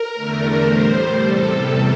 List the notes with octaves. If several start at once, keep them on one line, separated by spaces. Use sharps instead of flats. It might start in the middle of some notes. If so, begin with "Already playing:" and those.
Already playing: A#4
E2 D3 A3
A2 G3 C5
E2 C3 G3 A4